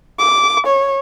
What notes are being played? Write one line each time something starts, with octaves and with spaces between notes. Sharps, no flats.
D6
C#5